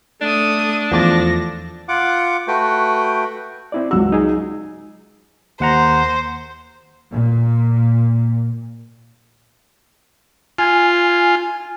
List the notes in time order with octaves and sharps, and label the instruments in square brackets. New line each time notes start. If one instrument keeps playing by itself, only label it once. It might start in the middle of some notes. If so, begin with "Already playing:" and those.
[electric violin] A3 D#6 [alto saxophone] D4
[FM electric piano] E2 A6 [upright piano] F3 D6 [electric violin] A3 A#6
[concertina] F4 F#5 D6
A3 F#4 B4 G5
[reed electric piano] C4 E4 D5
[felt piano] C#2 F#3 E6 [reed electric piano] F#4
[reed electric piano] D#4 G#4
[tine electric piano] D#2 F#5 A#5 [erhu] C5
[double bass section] A#2
[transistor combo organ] F4 [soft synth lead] G#5